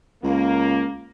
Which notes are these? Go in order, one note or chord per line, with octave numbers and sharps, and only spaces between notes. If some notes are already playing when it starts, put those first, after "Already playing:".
C#2 A#3